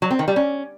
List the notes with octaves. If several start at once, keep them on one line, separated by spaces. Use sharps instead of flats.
F#3
C4
D#3
G3
C#4